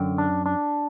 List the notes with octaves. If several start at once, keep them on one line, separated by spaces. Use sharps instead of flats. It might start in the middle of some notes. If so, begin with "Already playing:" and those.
Already playing: F#2 D3 G5
D4
D4